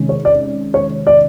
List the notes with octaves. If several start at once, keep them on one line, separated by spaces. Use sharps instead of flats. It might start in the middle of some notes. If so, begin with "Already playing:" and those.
Already playing: C3 D#3 G#3 C#4
C#5
D5
C#5
D5